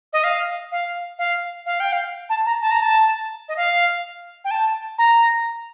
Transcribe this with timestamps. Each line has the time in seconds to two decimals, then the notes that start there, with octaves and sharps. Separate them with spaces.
0.13 D#5
0.24 F5
0.72 F5
1.19 F5
1.66 F5
1.80 G5
1.93 F5
2.29 A5
2.46 A#5
2.62 A5
2.71 A#5
2.82 A5
3.48 D#5
3.56 F5
4.44 G5
4.51 A5
4.98 A#5